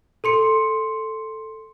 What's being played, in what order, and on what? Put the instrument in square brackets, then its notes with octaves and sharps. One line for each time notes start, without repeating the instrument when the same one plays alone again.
[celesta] A4 C6 C#7